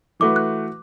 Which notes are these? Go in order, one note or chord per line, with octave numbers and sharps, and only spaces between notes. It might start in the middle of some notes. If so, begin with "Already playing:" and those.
E3 A3 F#4 B4 D6
F#6